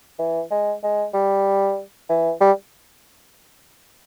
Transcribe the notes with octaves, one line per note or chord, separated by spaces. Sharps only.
E3
G#3
G#3
G3
E3
G3